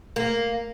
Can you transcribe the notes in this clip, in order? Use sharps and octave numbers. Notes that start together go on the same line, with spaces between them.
A#3